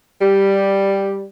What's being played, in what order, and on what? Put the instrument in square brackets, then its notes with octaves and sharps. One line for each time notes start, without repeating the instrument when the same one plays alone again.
[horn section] G3